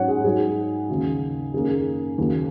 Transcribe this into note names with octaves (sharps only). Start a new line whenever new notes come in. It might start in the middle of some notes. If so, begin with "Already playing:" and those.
Already playing: G#2 F#3 C#4 C#5 F#5
G#4
G#2 F#3 D#4 G#4
D#2 C#3 F#3
F#2 D#3 A#3 C#4 G#4
D#2 C#3 F#3 A#3